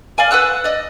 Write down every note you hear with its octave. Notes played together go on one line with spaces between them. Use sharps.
D5 F5 G#5
B4 F#5 E6 F#6
D5 D#5